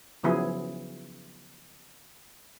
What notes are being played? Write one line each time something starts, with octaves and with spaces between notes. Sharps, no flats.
C#3 F3 F#3 B3 E4 G#4